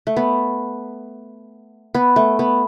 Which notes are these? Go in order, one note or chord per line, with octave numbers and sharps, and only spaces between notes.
A3
B3
B3
A3
B3